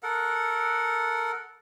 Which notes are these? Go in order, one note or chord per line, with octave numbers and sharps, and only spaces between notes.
A4 A#4 F#5